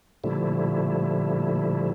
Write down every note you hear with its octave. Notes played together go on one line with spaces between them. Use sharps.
A#2 D3 F3 G3 A3 E4